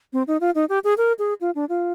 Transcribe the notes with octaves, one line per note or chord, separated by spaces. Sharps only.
C4
D#4
F4
D#4
G4
G#4
A#4
G#4
F4
D4
F4